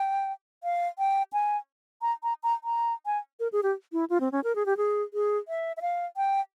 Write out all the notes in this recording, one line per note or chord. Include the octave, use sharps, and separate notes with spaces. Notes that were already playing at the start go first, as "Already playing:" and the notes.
Already playing: G5
F5
G5
G#5
A#5
A#5
A#5
A#5
G#5
A#4
G#4
G4
E4
F4
C4
C#4
A#4
G#4
G4
G#4
G#4
E5
E5
F5
G5